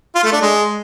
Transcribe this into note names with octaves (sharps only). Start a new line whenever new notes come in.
F4
A3
D4
G#3